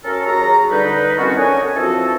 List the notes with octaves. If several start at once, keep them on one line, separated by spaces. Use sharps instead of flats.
C#4 F#4 A4 A#4
D#2 F#3 F#4 G#4 A#5
D3 G3 D#4 B4
D#3 E3 C4 C#4 F4 F#4
C#4 D4 A4 A#4 D#5 G#5
E3 F3 C4 F#4 A4